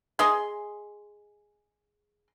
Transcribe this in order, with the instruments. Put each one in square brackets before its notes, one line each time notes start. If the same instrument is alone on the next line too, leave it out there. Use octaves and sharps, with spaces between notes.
[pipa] G#4 D#5 C6